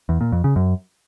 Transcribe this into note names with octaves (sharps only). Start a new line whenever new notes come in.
E2
A#2
F2
C#3
F#2